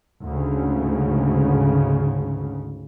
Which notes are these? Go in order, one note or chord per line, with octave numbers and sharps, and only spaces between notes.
D2 G#2 C#3